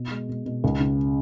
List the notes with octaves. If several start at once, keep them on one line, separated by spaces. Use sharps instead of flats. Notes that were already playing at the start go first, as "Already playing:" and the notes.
Already playing: B2
G#3
B2
B2
C#2
C#3